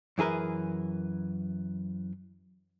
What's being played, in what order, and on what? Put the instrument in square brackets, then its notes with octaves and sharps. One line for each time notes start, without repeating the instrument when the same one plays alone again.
[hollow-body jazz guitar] F#2 E3 G#4 A#4 B4